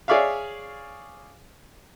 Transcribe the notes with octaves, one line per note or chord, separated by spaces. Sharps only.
G#4 C#5 D5 E5 F5